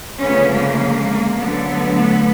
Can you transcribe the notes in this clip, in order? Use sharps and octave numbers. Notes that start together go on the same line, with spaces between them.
D2 C#3 F3 B3 C#4
G#3 A#3
D2 D3 F#3 A3 B3
A3 B3
A3 B3